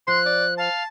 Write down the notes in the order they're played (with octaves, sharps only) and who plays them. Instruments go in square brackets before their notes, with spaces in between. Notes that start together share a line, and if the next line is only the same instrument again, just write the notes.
[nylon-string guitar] F3 [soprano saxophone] C6 [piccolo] F#6
[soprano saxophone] D5
[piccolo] F5 [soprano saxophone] A5